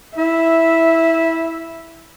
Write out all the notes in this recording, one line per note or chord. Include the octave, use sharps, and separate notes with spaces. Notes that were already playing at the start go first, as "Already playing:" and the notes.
E4 E5